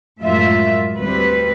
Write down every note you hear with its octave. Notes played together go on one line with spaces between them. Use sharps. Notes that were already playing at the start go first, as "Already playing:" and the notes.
F#2 A2 G#3 F4 E5
D2 G3 C4 B4